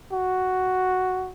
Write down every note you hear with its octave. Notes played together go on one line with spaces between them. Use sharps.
F#4